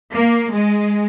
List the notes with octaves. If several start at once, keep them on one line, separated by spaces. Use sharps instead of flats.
A#3
G#3